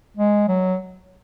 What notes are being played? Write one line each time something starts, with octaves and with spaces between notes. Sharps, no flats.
G#3
F#3